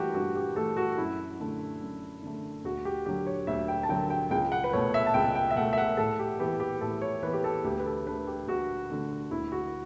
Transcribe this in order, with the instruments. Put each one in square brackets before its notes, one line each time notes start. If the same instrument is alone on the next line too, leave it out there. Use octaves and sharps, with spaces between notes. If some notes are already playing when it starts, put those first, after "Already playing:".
Already playing: [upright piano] G2 E3 A3 F#4 G4
G2 F#4
G4
E3 A3 A4
F#4
F#2 E4
D3 A3
F#2
D3 A3
D2 F#4
G4
D3 F#3 G4
C#5
D2 E5
G5
A5
D3 F#3 G5
G5
C#2 G5
F#5
B4
B2 A3 C#5
E5
A5
C#2 G5
G5
E5
B2 A3 F#5
E5
F#5
A2 A4
G4
E3 B3 G4
G4
A2 A4
C#5
E3 B3 B4
G4
A4
D2 G4
B4
A4
D3 A3 B4
G4
D2 F#4
D3 A3
D2 E4
F#4